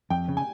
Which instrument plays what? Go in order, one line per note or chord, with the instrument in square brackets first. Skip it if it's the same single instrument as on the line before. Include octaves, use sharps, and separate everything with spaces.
[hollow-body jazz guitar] F2 [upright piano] G5
[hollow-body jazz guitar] C#3
[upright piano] G#5